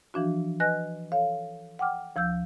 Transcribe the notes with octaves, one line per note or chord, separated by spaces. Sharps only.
E3 F3 D4 F#4
B4 D#5 G#5 F#6 A#6
A4 C#5 F5
F#5 G5 D6 F6
D2 F3 E6 G6